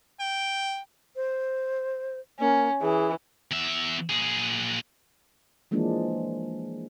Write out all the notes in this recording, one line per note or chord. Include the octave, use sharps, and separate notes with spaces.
G5
C5
A#3 C#4
E3 G#4
E2 E5
A#2 G#4
E3 F3 G#3 A#3 D4